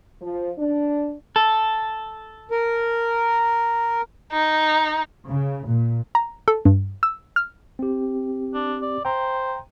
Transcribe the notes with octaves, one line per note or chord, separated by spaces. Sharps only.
F3
D4
A4
A#4
D#4
C#3
A#2
A#5
A4
G2
E6
F6
C4 G4
D4
D5
C5 G5 A#5